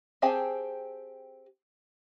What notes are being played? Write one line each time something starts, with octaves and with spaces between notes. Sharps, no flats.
C4 G4 G#4 G#5 A5